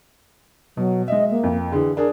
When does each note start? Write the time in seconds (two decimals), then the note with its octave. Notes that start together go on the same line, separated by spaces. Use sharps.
0.77 B2 F#3
1.08 G#3 D#5 E5
1.31 A#3
1.43 F2
1.72 D3 E3 G#4
1.97 D4 G#4 A#4